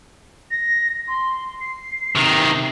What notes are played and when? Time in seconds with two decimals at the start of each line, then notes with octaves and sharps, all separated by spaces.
0.50 A#6
1.07 C6
1.60 C7
2.16 C3 D#3